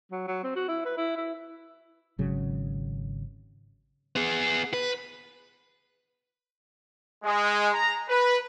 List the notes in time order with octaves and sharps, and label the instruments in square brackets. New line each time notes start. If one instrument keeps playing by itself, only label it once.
[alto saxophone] F#3
F#3
C4
F#4
E4
B4
E4
E4
[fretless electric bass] G#1 C#3 F#3
[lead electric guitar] B3 G#4
B4
[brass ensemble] G#3
A#5
B4